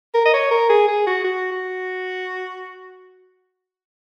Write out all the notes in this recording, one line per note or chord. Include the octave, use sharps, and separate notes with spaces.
A#4
D#5
C#5
A#4
G#4
G#4
F#4
F#4
F#4